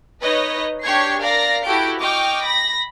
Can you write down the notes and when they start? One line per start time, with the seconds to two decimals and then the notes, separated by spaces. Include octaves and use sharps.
0.21 D#4 B4 C#5 D#5
0.82 D4 G4 C#5 C#6 G#6 C7
1.21 A#4 D5 F5 A#5 A#6
1.64 E4 F#4 G4 A4 G6 D7
1.99 D#5 G5 C#6 D6 F6
2.41 B5 A#6